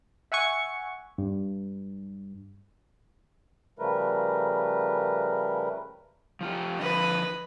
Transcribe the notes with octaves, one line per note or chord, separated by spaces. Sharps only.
E5 F#5 G#5 C#6
G2
C#3 F3 G3 A3 A#4 B4
F3 F4 G4
D3 F3 B4 D#5